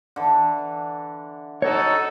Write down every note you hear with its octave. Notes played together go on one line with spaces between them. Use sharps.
D3 E3
D#4 F#4 A4 C#5